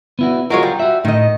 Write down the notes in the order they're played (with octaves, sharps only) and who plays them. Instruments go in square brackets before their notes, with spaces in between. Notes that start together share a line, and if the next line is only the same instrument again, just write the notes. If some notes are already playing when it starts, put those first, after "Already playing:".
[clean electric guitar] B3 E4 F#4
[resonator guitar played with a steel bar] F#3 G#3 C#5 [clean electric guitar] F4 F#4 A#4
[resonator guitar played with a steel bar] G3
[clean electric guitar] F#4 E5
[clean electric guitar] A2 [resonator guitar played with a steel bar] D#3 D#5